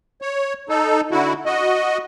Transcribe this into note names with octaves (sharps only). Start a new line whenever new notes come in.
C#5
D#4 A4
D3 E4 F#4
F#4 D#5